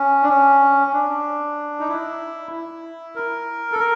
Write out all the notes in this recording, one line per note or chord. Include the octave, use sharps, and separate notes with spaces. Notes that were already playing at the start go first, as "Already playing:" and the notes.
Already playing: C#4
D4
C#4
C#4
D4
D#4
E4
E4
A#4
A4
A#4